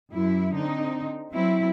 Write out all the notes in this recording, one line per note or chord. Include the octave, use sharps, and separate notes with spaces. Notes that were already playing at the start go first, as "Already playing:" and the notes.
F#2 E4
D3 C4 D#4
F#3 C4 E4